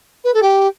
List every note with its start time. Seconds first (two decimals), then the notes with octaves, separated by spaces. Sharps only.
0.24 B4
0.34 A4
0.42 G4